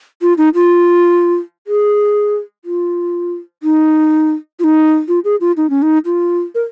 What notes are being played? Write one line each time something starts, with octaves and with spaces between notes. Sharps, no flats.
F4
D#4
F4
G#4
F4
D#4
F4
D#4
F4
G#4
F4
D#4
C#4
D#4
F4
A#4